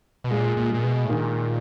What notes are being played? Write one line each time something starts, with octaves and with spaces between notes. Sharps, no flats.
B2
A#2 G#3
A#2
A#2 G#3
B2
A2
A#2 D#3